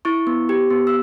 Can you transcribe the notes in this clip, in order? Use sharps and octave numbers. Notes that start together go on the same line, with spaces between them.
E4 C#6
B3
G4
B3
E6